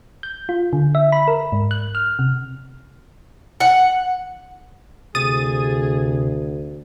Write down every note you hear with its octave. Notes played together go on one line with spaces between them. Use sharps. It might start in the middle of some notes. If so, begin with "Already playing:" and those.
G6
F4
D3
E5
B5
A#4
G#2
F#6
F6
C3
F#5
D2 C3 G#4 D#6 A6 D#7